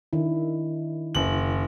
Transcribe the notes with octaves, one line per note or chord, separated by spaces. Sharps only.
D#3 D4 E4
F#1 F#7